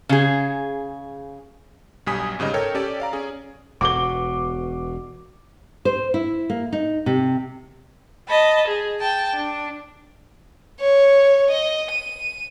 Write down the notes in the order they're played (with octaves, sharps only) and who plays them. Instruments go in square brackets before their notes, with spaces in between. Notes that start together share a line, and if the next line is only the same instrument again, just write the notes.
[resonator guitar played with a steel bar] C#3 G#4
[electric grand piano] B1 G2 G3 G#5 D#6 B6
G1 G#2 C#3 G3 D#5
A4 A#4 C#5 G5
C#4 G4 A4 D5
D5 F5 A#5
C#4 G#4
[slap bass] E1 B2 [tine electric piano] F#4 [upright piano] D6 G7
[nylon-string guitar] C5
E4
A#3
D#4
C3
[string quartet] D#5 A5 B5
G#4
G5 A5
D4
[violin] C#5
D#5
D#7